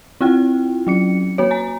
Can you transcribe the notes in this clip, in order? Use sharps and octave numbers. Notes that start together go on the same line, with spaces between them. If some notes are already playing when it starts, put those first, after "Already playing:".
C4 E4 F4 G5
F#3 C#4 C#7
A#3 F#4 C#5
G#5 A#5